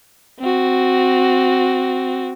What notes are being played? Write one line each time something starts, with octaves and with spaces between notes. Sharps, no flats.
C4 F#4